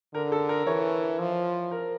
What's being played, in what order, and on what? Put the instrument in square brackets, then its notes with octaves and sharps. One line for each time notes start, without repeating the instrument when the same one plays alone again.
[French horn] D3 [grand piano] A#4
[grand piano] A4
A#4
[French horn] E3 [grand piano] C#5
[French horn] F3
[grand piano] A#4